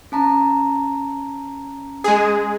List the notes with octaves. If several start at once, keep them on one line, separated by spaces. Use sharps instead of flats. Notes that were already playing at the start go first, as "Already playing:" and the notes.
C#4 A5 A#5
G#3 G#4